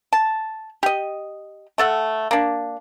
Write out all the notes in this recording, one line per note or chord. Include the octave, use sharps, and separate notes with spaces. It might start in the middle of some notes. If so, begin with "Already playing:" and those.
A5
G4 D#5
A3 A4 F#5
A#3 D4